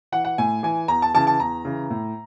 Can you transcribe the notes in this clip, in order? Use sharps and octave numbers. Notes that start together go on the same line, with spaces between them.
E3 F#5
F#5
A2 G#5
E3 G#5
E2 A#5
A5
C#3 E3 A5
A5
E2 A#5
C#3 E3
A2